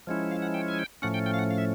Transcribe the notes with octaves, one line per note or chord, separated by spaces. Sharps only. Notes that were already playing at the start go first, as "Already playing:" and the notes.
F3 G#3 C#4 E4
F5
F#5
G5
G#5
G5
A2 F3 A3 C#4 F#5
G5
G5
F5
F#5
F5
E5